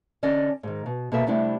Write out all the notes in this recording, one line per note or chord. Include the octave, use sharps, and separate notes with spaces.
D3 C#4 D5 D#5
G#2 D#3
B2
B2 A#3 A4 E5
C3 G3 A3 D4 E4 G4